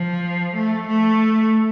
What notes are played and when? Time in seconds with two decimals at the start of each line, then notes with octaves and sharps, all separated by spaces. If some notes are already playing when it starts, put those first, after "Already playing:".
Already playing: F3
0.55 A3
0.87 A3